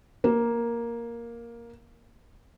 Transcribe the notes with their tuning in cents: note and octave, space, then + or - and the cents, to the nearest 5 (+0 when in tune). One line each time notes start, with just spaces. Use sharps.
A#3 +5